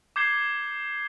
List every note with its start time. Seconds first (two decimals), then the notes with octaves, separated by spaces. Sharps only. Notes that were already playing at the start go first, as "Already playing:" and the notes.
0.16 D6 G6 G#6 C7 C#7 G7